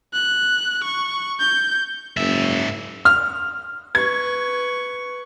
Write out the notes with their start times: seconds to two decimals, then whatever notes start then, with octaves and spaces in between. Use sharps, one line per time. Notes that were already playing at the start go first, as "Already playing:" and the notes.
0.13 F#6
0.84 C#6
1.40 G6
2.17 F#1 G#2 E5
3.05 F6
3.95 B4 C#6 G#6